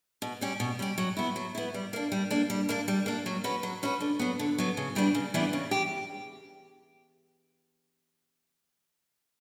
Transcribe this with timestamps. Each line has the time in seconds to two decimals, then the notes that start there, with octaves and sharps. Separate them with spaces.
0.22 B2
0.41 G3 C#4 G4
0.60 B2
0.79 G3 C#4 G4
0.98 F#3
1.17 B3 E4
1.36 F#3
1.55 B3 E4
1.74 G3
1.93 A#3 D4
2.12 G3
2.30 A#3 D4
2.50 G3
2.69 A#3 D4
2.88 G3
3.06 A#3 D4
3.26 F#3
3.44 C#4 F#4 B4
3.63 F#3
3.83 C#4 F#4 B4
4.01 D3
4.19 F#3 B3
4.39 D3
4.58 F#3 B3
4.77 C#3
4.95 E3 G3 B3 D4
5.15 C#3
5.34 E3 G3 B3 D4
5.53 C#3
5.71 G4